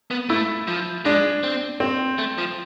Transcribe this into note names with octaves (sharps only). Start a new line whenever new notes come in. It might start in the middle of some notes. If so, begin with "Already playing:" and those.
B3
A3 E4
F3
G#3 D4
C4
C4
A3
F3